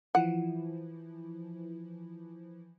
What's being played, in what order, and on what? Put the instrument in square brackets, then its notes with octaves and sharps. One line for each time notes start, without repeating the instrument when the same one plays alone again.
[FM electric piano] E3 F3 E4 [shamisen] F#5